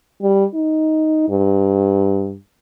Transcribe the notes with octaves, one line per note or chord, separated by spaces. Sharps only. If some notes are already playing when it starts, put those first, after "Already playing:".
G3
D#4
G2